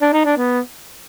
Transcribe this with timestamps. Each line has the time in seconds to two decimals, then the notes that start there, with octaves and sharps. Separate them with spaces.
0.01 D4
0.13 D#4
0.25 D4
0.37 B3